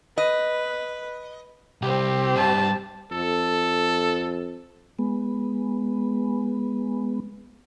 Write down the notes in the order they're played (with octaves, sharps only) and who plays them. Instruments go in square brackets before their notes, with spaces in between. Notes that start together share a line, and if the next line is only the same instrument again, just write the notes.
[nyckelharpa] B4 [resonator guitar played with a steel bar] D#5
[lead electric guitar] C2 [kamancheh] C4 G4
[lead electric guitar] G2 [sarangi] A5
[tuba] F2 [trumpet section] A4
[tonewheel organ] G#3 B3